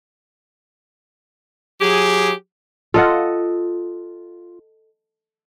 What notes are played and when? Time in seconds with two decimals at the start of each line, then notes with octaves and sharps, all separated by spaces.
1.81 F#3 G4 G#4
2.94 F4 A4 D#5 F#5